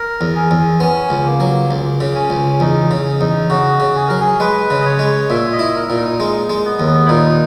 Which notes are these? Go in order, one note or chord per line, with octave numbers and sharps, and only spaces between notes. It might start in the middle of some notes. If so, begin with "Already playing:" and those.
Already playing: A#4
E2
G#4
E2
B3 C#4
C#2
A#3
F#3
C#2
C#3
C#4
C#2
E2 D#4
C#3
E2 D#4
C#3 F#4
C#3
G#4
F#3 A#4
G#4
G#3 B4
C#3
D#5
C#5
G#3
A#2 E5
D#5
E4
A#4
A#2
D#4
G#3 D#4
G#3
B3
D#2
B3
E4
A#2 D#4